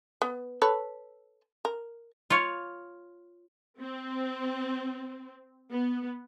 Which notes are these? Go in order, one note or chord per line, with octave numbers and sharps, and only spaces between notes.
B3
A4 B4 C#5
A#4
F4 C#5
C4
B3